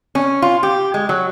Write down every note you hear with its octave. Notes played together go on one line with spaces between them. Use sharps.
C#4
F4
G4
G#3
F#3